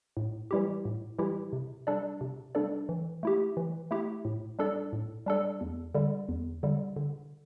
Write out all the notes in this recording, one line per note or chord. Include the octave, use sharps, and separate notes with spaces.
A2
E3 G3 E4 G4
A2
E3 G3 E4 G4
C3
G3 D4 A4 D5
C3
G3 D4 A4 D5
E3
A3 E4 G4
E3
A3 E4 G4
A2
G3 D4 A4 D5
A2
G3 D4 A4 D5
E2
D3 G3
E2
D3 G3
D3